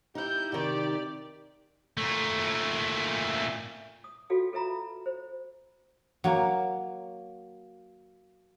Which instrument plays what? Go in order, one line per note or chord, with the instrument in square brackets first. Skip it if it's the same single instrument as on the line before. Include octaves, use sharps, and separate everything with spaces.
[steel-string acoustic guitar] D#4 E4 [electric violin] G4 G6
[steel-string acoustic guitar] C3 D#3 [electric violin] G4 D5
[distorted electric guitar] A#2 A3
[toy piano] D#6
F4 F#4 A4 F5 G5
A4 B4 E5 A#5 B5
C5
[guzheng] F#3 A#3